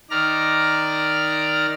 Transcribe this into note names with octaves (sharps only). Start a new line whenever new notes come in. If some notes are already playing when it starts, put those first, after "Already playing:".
D#3 D5 A#5 F6